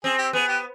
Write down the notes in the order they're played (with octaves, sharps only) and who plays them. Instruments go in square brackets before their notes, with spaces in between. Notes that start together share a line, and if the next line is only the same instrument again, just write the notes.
[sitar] C4 [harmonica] G#4
[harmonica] G4
[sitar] B3 [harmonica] G#4
[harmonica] G4